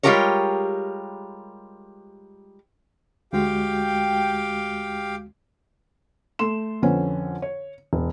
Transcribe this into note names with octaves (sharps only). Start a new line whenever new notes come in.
G3 G#3 F4 G4 A#4 C#5
D2 G#3 F#4 G4 F5 G5
A3 A4 C6 E7
F2 D3 C4 C#4 B4
C#5
E1